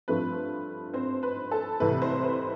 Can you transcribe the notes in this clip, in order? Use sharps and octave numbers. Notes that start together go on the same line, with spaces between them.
G2 F3 A3 C4 B4
C4 C5
B4
A4
C2 C3 E3 A3 B4
C4 C5
B4